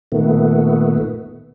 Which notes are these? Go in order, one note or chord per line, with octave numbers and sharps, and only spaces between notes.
A#2 D#3 A3 B3